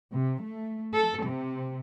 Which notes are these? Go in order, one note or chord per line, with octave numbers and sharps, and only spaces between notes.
C3
A3
A4
C3